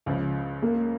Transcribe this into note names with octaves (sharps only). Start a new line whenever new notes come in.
C#2 C#3 F3
A#3